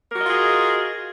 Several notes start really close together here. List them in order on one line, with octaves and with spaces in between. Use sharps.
A#4 F#4 D#5 F4 G#4